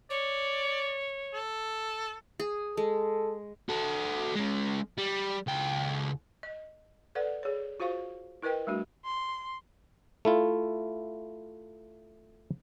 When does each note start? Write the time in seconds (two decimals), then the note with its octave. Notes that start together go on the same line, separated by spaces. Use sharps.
0.10 C#5 D5
1.34 A4
2.40 G#4
2.77 G#3 A4
3.69 F#4 A4
4.35 G#3 C#4
4.98 G3
5.47 C#2 G5
6.43 D#5
7.15 A4 B4 D5 F#5
7.43 G#4 C#5
7.80 F4 F#4 C5 F5 C#6
8.42 E4 A#4 B4 D#5 G5
8.67 G3 A3 D4 F#4
9.05 C6
10.25 A3 E4 F4